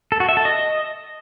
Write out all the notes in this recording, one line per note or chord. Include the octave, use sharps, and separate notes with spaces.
A4
F#4
E5
A4
D#5